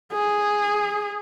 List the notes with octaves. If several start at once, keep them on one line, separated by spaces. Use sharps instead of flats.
G#4